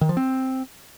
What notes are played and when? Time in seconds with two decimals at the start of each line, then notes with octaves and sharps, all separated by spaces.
0.01 D#3
0.09 F3
0.17 C4